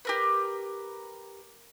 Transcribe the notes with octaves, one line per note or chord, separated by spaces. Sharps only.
G4 A#4 B4